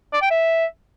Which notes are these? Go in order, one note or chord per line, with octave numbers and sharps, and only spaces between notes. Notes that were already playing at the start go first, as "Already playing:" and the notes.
D5
G5
E5